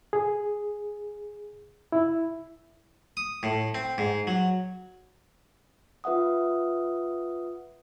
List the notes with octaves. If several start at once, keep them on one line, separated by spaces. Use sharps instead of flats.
G#4
E4
D#6
A2
C4
G#2
F#3
F4 B4 E5 F#5 D#6